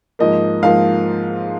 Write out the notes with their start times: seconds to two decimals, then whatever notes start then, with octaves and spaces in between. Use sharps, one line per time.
0.19 G#2 F3 A#3 D#5
0.63 G#2 F3 A#3 F5